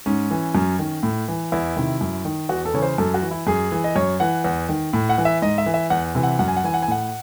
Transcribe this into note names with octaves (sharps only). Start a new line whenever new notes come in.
G#2 C#4
E3
F#2
D#3
A2
E3
E2 E4
C3 D#3
F#2
D#3
E2 F#4
A4
C#3 E3 C#5
C5
F#2 A4
F#4
E3
E4
F#2 G#4
E3
D#5
F#2 C#5
E3 F#5
E2
D#3
A2
F#5
E3
E5
G#2 D#5
E5
E3
E5
E2 F#5
C3 E3
F#5
F#2 F#5
G#5
F#5
E3 G#5
F#5
G#5
A2 F#5